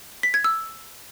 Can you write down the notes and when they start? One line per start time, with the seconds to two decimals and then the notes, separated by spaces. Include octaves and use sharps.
0.23 B6
0.34 G#6
0.44 E6